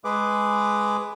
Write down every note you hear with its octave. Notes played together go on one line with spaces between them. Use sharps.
G#3 G#4 B4 D6